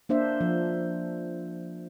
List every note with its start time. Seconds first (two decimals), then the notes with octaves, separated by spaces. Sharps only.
0.09 A#3 D4 C5 E5
0.41 F3